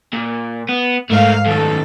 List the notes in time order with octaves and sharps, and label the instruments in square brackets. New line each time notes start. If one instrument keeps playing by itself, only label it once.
[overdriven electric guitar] A#2
B3
[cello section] G#2 F5 [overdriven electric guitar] A3 A#4
[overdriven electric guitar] F#2 D#3 [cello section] A4